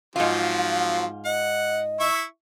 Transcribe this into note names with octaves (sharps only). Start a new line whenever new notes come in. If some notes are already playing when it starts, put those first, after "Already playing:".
G#2 F3 F#3 C4 F4 F5
D#5 F#5
E4 E5 C#6